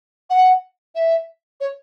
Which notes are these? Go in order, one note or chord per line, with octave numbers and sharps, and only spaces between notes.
F#5
E5
C#5